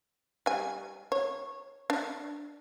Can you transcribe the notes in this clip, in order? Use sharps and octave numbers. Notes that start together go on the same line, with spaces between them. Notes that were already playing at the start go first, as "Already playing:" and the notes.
G3 G#5
C#5
D4